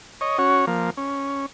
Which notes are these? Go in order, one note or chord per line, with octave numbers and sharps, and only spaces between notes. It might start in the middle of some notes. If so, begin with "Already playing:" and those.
C#5 D#5
C#4 F#4 C#5
F3 A#3
C#4